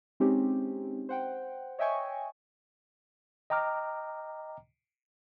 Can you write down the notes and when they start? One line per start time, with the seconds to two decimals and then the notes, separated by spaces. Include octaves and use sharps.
0.20 G#3 C4 C#4 D#4 G4
1.09 C5 F#5 G5
1.79 C#5 D#5 E5 G5 G#5 C#6
3.50 D#5 G5 A#5 D6 F6